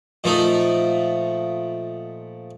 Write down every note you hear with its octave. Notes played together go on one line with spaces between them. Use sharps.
A#2 F3 A3 D#4